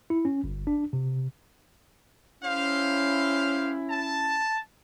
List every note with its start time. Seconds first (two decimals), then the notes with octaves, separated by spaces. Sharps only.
0.10 E4
0.25 C#4
0.44 G1
0.67 D4
0.93 C3
2.43 C#4 E4 G4 C5 F5
3.90 A5